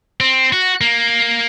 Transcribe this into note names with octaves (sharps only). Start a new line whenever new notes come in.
C4
F#4
A#3